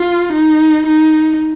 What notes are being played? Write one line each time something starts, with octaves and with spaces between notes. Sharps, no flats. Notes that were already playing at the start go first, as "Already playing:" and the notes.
Already playing: F4
D#4
D#4